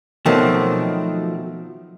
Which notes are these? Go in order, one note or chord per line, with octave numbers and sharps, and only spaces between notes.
B2 D#3 F3 F#3 A3 C4